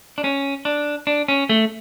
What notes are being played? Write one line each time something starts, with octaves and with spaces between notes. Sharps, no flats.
D4
C#4
D4
D4
C#4
A3